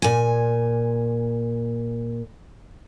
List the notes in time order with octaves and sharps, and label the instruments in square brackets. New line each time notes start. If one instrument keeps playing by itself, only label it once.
[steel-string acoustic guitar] A#2 G#5